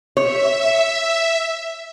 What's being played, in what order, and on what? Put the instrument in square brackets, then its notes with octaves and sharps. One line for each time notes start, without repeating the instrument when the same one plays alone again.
[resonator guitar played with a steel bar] C#5 [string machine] E5